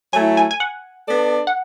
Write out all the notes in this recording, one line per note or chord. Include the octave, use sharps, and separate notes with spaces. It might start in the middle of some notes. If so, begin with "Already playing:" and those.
F#3 A3 E4 G#5
G#5
G#5
F#5
B3 D4 A4 D5
F#5